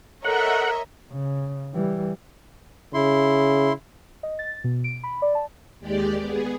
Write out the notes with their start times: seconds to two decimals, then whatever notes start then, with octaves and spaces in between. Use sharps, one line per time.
0.24 A4 A#4 C#5 D#5 E5 F#5
1.12 C#3
1.73 E3 G3
2.94 C#3 E4 C6
4.23 D#5
4.39 A6
4.64 B2
4.84 D7
5.03 B5
5.22 D5
5.35 A5
5.79 D#2 G#3 G4 D5
6.19 B3 G#4